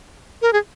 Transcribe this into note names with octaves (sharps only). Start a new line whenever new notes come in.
A#4
G#4